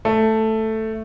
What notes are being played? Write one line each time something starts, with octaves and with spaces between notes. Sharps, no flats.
A3